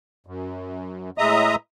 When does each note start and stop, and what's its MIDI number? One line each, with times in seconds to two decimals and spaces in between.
0.27 1.10 42
1.18 1.55 45
1.18 1.55 56
1.18 1.55 75
1.18 1.55 76
1.18 1.55 82
1.18 1.55 87